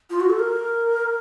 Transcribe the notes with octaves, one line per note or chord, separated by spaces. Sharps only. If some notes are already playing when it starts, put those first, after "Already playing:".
F4
F#4
A4
A#4